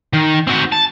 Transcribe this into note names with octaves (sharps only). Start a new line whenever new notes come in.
D#3
C4 F#4
A5